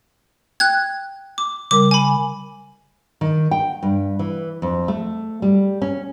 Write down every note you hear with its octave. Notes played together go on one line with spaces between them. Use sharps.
G5 F#6 G#6
D6
C#3 G3 A#4 D6
G#5 B5
D#3
G5
G2
E3
F2
A3
G3
C#4